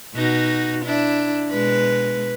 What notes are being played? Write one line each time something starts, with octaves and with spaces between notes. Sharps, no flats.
B2 D#4 F#4
D4 E4
B2 G#3 B4